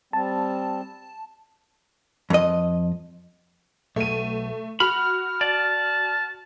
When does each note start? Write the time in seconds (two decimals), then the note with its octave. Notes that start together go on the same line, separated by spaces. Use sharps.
0.13 G3 C4 A5
2.30 F2 D#5
3.96 B1 A3 D#7
4.80 F#4 B5 F6
5.41 D5 A5